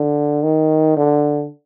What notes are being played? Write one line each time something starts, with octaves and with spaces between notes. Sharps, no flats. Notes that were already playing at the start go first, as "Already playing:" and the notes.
Already playing: D3
D#3
D3